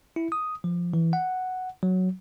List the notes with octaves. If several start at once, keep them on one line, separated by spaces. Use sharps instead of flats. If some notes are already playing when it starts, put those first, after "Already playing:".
E4
D#6
F3
E3
F#5
F#3